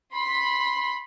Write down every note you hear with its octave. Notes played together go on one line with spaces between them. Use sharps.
B5 C6 B6